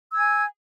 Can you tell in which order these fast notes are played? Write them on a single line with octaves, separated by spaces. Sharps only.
E6 G#6 G#5